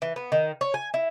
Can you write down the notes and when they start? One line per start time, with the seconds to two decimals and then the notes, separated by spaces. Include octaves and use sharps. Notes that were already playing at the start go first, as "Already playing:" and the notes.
0.02 E3
0.16 B3
0.32 D#3
0.61 C#5
0.74 G#5
0.94 E4